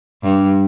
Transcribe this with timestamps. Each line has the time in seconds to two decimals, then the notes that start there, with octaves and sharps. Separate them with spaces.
0.23 G2